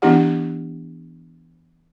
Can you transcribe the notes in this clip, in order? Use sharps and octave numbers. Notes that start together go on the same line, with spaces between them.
E3 B3 D4 E4 G4 F#5